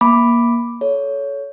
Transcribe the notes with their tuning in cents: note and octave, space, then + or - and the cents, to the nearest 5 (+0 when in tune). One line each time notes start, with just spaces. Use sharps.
A#3 +20 B5 +0 D6 +0
A4 -20 C#5 +15